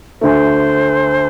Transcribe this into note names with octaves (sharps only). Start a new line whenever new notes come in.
D2 D3 A3 C5